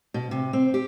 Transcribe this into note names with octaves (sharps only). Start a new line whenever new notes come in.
B2
C3
C4
G4